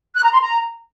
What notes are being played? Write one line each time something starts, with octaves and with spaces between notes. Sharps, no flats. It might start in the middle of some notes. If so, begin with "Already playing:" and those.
F#6
A#5
C6
A#5